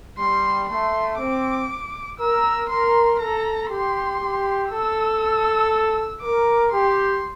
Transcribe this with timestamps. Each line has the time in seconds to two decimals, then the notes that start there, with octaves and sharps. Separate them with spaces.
0.18 G3 C6
0.69 A3 C6
1.19 C4 D6
2.20 A#4 E6
2.70 A#4 C6
3.20 A4 A#5
3.70 G4 C6
4.21 G4
4.71 A4 E6
6.21 A#4 D6
6.72 G4 C6